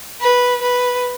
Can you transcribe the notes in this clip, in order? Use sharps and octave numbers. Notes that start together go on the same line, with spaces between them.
B4
B4